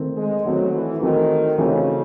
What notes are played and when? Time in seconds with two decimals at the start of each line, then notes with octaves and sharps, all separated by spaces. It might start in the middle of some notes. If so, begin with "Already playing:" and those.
Already playing: D#3 A3 C4
0.16 G#3
0.45 D#3 F#3 A3 C4
0.73 E3
1.01 D#3 E3 A3 C4 D#4 F#4
1.58 C#3 E3 A3 C4 D#4 F#4